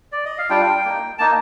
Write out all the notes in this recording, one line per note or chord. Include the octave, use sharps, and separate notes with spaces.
D5
D#5
F5
G3 D4 F4 G5
A#3 D#4
A#3 D#4 A5